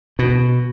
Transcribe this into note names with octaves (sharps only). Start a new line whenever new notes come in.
B2